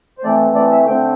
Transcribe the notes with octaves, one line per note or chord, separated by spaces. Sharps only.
C5
E3 A3 C4 D5
D5
E5
D3 A3 C4 G5